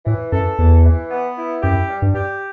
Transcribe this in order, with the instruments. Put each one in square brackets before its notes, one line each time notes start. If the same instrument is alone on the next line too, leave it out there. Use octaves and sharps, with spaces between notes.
[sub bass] A2 [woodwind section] E3
[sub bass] F#2 [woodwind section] A4
[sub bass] E2 [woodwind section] E3
[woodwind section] E3
B3
E4
[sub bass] F#2 [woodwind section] G4
[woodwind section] G3
[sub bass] G2
[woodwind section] G4